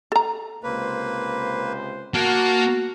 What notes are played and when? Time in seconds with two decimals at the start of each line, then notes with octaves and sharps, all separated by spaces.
0.12 A4 A#5
0.63 C#2 C3 A#3 B4 C5
2.14 A#3 F#4 A#4 F#5 A5